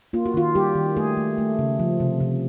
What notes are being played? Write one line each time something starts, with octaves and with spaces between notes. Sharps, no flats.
A#3 F4
F#4
D#3 F4
G3 G4
D#3
A3 G#4
A3
A3
C#3
F3
C3
C3